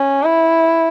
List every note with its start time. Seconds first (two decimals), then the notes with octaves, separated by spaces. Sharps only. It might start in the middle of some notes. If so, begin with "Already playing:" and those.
Already playing: C#4
0.24 E4